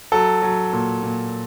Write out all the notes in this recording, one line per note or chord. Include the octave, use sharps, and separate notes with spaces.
F#3 A4
F#3
A#2
A#2